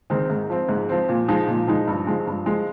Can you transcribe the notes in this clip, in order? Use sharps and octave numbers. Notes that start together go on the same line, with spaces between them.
D#3 G#3 C4 D#4
G#2
F3 C4
G#2
F3 C4
A#2
F3 G#3 D#4
A#2
F3 G#3 D#4
G2
F3 G#3
G2
F3 G#3